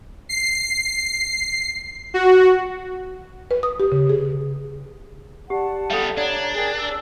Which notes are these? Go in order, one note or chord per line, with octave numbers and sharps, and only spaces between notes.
C7
F#4
B4
D#6
G4
C#3
G#4
G4 D5 F#5 A5
G3 B3 A4 F5
D4 C#5 D5 A#5
G#4 A#4 G5
E6